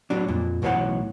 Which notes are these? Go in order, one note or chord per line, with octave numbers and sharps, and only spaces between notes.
A2 F#3 D4
F2 A#2
B1 A2 E3 C5 C#5 F#5